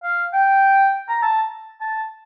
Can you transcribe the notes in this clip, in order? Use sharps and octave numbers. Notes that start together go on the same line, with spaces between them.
F5
G5
A#5
A5
A5